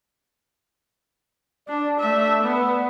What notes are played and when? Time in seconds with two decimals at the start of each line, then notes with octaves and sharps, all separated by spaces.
1.68 D4 D5
1.99 A3 E5
2.43 B3